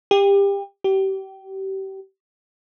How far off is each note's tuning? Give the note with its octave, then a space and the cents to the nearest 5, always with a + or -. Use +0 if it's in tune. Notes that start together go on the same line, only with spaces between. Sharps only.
G4 +25
G4 -30